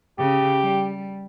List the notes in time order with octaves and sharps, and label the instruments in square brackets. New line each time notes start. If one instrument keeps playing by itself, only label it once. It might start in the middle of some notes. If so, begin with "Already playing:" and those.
[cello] C#3 [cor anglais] G4
[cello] G3